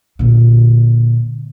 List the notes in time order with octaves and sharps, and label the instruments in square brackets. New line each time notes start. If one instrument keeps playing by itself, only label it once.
[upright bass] A#2 D3